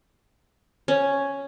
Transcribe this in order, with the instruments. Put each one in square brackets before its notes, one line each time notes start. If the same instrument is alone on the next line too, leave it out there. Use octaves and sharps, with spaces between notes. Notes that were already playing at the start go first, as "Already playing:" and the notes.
[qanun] C#4